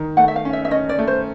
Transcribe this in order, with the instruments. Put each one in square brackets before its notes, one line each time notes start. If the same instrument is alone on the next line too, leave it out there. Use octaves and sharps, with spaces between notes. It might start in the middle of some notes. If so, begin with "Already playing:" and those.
Already playing: [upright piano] D#3
[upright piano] A3 [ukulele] F#5
[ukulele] E5
F5
[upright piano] C#4
[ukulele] E5
E5
[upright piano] C#4 [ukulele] D#5
[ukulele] D5
[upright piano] A3
[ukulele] C5